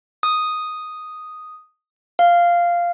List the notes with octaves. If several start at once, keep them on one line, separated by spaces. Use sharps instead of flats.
D#6
F5